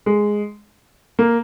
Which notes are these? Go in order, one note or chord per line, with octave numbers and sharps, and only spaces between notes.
G#3
A#3